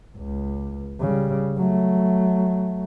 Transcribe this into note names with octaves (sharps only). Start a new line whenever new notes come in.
C#2
C#3 G3
F#3 A3